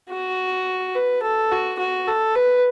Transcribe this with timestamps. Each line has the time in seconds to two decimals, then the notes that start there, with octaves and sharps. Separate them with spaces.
0.10 F#4
0.96 B4
1.23 A4
1.52 F#4
1.79 F#4
2.08 A4
2.35 B4